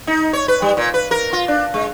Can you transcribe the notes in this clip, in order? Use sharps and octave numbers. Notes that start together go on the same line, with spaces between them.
D#4
C#5
B4
G3
A#2
B4
A#4
F4
D4
G#3